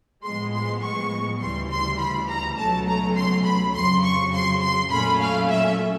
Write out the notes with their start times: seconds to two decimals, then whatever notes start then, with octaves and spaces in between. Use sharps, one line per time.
0.23 A2 F3 G#3 B3 C6
0.53 C6
0.82 C#6
1.40 D2 C#3 E3 G3 C6
1.69 C6
1.99 B5
2.28 A#5
2.57 C#2 B2 F#3 A3 C#4 A5
2.86 A#5
3.15 C6
3.44 B5
3.74 F2 C#3 F#3 C6
4.03 C#6
4.33 C6
4.61 C6
4.90 A#2 F#3 A3 C#4 B5
5.20 F5
5.49 E5